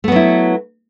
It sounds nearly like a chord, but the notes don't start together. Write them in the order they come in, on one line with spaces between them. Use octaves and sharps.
A3 B3 F#3 E4